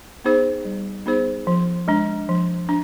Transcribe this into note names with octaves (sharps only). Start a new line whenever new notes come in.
B3 D#4 G#4 C5
G3
B3 D#4 G#4 C5
F3
G#3 D4
F3
D4